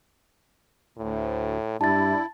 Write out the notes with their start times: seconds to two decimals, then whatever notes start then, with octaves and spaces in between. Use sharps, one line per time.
0.97 D2 A2
1.81 G2 D4 E4 A5 A6